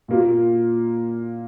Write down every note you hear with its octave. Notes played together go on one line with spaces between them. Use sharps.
A#2 A#3 F4